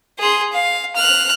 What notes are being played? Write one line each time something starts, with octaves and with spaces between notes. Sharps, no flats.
G#4 C6
F5
F6 F#6